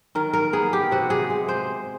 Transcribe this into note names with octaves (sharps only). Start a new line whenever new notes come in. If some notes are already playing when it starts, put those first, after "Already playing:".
D#3 A#4
A#4
B3 G#4
G4
C3 F#4
G#4
G#3
C5